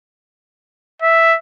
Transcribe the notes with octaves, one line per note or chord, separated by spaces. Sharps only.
E5